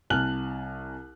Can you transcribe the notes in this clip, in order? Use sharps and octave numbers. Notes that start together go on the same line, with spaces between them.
C2 G#5 A5 F6 F#6 F#7